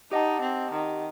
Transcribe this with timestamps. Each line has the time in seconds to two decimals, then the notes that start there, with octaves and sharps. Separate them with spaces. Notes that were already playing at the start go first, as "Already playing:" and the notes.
0.11 D#4 G4 D#5 F#5 A5
0.41 C4
0.72 D#3